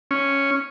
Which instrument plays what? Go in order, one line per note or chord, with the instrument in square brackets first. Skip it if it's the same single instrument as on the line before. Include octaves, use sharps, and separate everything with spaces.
[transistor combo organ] C#4